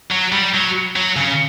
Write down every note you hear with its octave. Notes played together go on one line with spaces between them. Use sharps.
F#3
G3
F#3
F#3
C#3